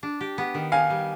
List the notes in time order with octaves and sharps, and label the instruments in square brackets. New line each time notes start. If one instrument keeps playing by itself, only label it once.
[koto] D4
G4
B3
D#3
[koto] D#4 [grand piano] F5 G#5
[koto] G3